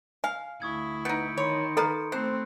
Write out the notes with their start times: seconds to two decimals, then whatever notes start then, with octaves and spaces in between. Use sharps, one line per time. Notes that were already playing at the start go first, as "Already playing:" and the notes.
0.24 F5 G#5
0.62 D2 E4 C#6 D#6 G#6
1.05 B3 D#4 G6 C#7 D7
1.37 D#3 C#5 B5 C6 C#7
1.77 A4 B4 F5 A5 A#5
2.12 A3 C4 C5 F#6